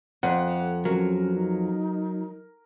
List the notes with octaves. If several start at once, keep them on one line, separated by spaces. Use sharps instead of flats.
F2 F#5
F#3 C#4 A#4
D#4